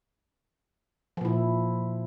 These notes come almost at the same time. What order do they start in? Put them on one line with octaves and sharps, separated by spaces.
F3 A#2 E4